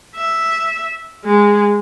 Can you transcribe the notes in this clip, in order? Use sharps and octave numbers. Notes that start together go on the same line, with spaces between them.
E5
G#3